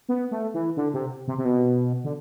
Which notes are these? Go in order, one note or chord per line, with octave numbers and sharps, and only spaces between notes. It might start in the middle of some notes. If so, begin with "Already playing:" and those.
B3
A3
E3
D3
C3
C3
C3
B2
D3